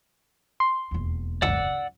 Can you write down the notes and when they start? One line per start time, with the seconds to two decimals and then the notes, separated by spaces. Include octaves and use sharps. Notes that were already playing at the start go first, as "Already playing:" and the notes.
0.60 C6
0.91 E1 D#2
1.42 G#1 C#2 F#2 D5 F#5 E6